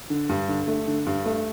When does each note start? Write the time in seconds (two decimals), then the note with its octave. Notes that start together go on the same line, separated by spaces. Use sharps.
0.10 D3
0.29 G2
0.48 D3
0.67 A3
0.87 D3
1.06 G2
1.25 A3